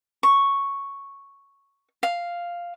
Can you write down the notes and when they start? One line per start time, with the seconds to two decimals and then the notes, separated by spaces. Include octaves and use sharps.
0.23 C#6
2.03 F5